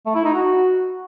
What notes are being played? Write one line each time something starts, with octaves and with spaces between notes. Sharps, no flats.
A3
E4
D#4
F#4